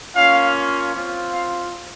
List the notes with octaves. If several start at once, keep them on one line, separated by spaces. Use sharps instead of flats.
A#3 C#4 F4 F5
C4 F4
F5